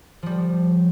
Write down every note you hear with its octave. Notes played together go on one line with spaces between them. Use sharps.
F3 G3